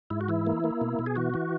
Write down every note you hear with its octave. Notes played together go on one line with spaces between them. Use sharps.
G#2 E4
F#4
E3 E4
A#3
A#3
B2
B2
G#4
E3 F#4
E3